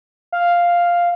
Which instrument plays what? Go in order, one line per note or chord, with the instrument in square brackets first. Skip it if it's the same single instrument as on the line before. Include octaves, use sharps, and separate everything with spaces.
[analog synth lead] F5